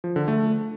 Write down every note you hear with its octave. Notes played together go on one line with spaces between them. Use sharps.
F3
D3
A3